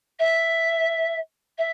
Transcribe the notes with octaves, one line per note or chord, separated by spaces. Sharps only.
E5
E5